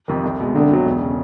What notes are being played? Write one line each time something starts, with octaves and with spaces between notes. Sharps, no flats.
F2 C3 D#3
C2
B2 G#3
C2 D3
B2 F#3
E1
C#3